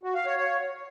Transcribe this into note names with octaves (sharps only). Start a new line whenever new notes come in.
F#4
F5
C#5
C#5